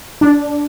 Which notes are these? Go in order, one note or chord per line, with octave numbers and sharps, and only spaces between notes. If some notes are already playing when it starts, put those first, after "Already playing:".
D4